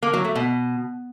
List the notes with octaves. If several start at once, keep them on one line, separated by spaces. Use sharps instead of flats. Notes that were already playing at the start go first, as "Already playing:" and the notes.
A#3
F#3
A3
B2